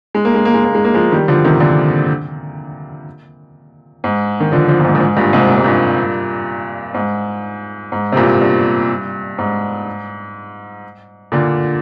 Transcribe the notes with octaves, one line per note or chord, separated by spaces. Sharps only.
G#3
A#3
G#3
A#3
G#3
A#3
G#3
A#3
F3 G#3
D#3 G3
D3 F3
C3 D#3
A#2 D3
G#2
D#3
D3 F3
D3 F3
A#2
G#2
A#2
G#2
G2 A#2
G#2 C3
A#2
G#2
G2 A#2
G#2
G#2
C3
G2 A#2
G2
G#2
A#2 D3